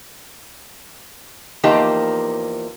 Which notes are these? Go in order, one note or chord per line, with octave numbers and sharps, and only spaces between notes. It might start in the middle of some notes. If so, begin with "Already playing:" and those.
E2 F3 A#3 D#4 G4 A5